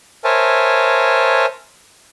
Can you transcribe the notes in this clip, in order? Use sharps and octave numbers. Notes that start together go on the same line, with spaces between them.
A#4 C5 C#5 E5 G#5 A5